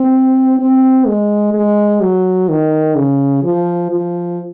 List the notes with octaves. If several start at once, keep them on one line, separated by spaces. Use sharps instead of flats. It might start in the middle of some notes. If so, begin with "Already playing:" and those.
Already playing: C4
C4
G#3
G#3
F#3
D#3
C#3
F3
F3